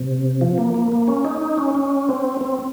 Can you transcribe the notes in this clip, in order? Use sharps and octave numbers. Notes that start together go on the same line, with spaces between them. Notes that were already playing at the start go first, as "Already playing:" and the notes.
Already playing: C3
F3
A#3
A#3
A#3
C#4
D#4
D#4
C#4
C#4
C4
C4